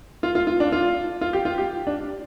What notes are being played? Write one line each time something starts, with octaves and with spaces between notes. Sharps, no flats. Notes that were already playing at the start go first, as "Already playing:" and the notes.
F4
F4
F4
D4
F4
F4
G4
F4
G4
D4